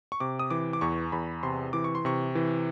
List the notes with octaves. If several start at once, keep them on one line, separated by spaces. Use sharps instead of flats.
C#6
C3 D6
D#6
E3 D6
D6
E2 C#6
E2 B5
C3 C6
E3 D6
C#6
C6
C3 C#6
E3